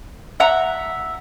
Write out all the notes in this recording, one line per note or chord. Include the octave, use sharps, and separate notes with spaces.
E5 F#5 A#5